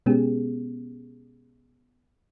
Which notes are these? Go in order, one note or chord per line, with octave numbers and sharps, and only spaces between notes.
B2 G#3 B3 C#4 G4 G#4